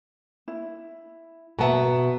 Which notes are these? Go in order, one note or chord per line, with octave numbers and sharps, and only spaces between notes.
E4
B2 B3 E5 A5 A#5